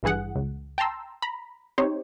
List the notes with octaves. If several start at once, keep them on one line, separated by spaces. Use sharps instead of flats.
G#1 G2 E3 G#4 F#5
C#2
G5 A5 A#5 C6 E6
A#5 B5
C4 D#4 G4 C5 C#5